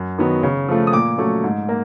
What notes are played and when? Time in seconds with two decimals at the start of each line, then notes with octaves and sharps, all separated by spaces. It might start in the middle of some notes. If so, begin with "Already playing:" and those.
Already playing: F#2
0.18 D#3 F#3 B3
0.43 C#3
0.68 F3 A3
0.87 D#6
0.93 A#2 D6
1.18 F#3 A3 C#4
1.44 G#2
1.69 A#3